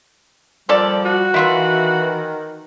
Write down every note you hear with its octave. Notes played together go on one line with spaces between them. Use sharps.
F3 G3 A#3 A4 D5
F#4
D#3 E3 E4 F4 E5